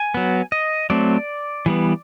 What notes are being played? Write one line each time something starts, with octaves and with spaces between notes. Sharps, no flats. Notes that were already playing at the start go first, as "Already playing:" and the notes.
Already playing: G#5
F#3 B3
D#5
F#3 A3 C4 D5
E3 G3 B3